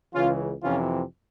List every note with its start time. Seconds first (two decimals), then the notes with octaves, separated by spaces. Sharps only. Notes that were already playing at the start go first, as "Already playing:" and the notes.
0.14 C#2 C#3 E3 C#4 F4
0.63 F2 C3 E3 C#4 F4